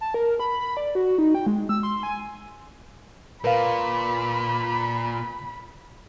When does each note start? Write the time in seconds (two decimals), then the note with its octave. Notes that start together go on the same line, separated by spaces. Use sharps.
0.01 A5
0.14 A#4
0.40 B5
0.60 B5
0.77 D5
0.95 F#4
1.18 D#4
1.35 G5
1.47 G#3
1.69 E6
1.83 C6
2.03 G#5
3.44 A#2 A#4 B4 F5 B5